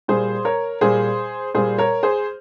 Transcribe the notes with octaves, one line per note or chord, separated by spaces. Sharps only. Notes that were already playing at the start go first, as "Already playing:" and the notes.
A#2 G3 G#4 C5
A#4 C#5
A#2 G3 G#4 C5
A#2 G3 G#4 C5
A#4 C#5
G#4 C5